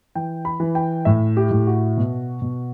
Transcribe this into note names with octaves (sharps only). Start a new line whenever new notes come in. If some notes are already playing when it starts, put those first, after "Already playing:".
E3 G5
B5
E3
G5
A2 E5
G4
A2
F#4
B2
B2